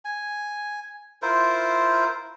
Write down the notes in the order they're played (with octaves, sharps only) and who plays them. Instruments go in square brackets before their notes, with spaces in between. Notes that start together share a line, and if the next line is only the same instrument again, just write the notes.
[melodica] G#5
E4 F4 A#4 C5